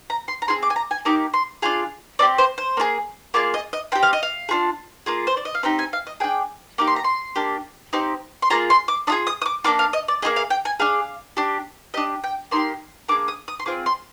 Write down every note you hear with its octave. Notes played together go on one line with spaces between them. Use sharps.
A#5
C6
A#5
C4 F4 G#4 C6
D6
G#5
A#5
G#5
A#3 D#4 G4 D6
C6
D4 F4 G#4 F5
C4 G4 D5
C5
C5
A#3 F4 G#4
A#3 F4 G#4 D5
D#5
D#5
C4 G4 G5
F5
D#5
F5
D4 F4 G#4
A#3 F4 G#4
C5
D5
D#5
F5
C4 D#4 G4 G5
G#5
F5
D#5
D4 G#4 G5
A#3 D#4 G4 D6
C6
A#5
C6
A#3 D4 G4
C4 D#4 G4
C6
A#3 F4 G#4 A#5
C6
D6
D4 F4 G#4 D#6
D#6
D#6
D6
A#3 D4 F4 D6
F5
D#5
D5
A#3 F4 G#4 D#5
F5
G5
G#5
D4 G#4 F5
D4 G4
D4 G4 D#5
G5
A#3 D#4 G4 C6
A#3 D4 G#4 D6
D#6
D#6
C6
C4 F4 G#4 D6
C6